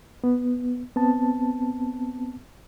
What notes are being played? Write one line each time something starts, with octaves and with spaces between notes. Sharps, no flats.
B3
B3 C4 A5